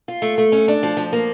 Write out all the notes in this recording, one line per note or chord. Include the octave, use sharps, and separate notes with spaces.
F4
A3
A3
C#4
D4
F3
F3
A#3